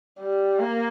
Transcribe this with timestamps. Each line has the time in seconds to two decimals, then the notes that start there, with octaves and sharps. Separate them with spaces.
0.20 G3
0.60 A#3